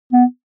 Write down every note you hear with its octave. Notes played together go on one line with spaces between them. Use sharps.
B3